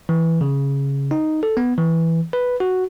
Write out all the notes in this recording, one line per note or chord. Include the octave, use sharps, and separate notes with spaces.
E3
C#3
D#4
A4
B3
E3
B4
F#4